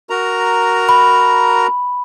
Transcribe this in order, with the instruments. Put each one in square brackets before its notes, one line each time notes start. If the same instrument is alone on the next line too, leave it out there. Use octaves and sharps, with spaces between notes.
[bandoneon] F#4 A#4 A#5
[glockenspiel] B5